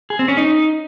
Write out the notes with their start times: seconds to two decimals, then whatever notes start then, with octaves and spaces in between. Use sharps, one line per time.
0.10 G#4
0.19 C4
0.28 C#4
0.37 D#4